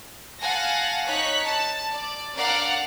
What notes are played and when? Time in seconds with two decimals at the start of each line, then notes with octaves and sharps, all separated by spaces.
0.40 F5 F#5 G#5 A5 A#6
1.07 D#4 C#5 F#6 B6
1.43 A5
1.91 D5
2.35 D4 A#4 D5 F5 F#5